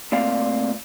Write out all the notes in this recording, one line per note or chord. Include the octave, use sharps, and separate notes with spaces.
A#2 A3 C4 D5 F5